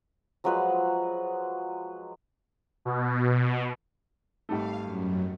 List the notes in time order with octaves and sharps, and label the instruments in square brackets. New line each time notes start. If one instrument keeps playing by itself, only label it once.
[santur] F3 F#3 G#3 B4
[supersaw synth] B2
[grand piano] G#1 G3 A3 [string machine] F5
[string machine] F#2